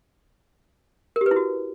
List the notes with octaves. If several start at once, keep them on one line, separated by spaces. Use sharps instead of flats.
A#4
G4
B4
E4
F#4